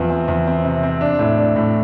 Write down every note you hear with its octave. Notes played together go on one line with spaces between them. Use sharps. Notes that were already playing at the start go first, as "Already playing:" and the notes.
Already playing: E2 F3 C4
C4
E2
C4
C3
C4
D4
A2
D4
A2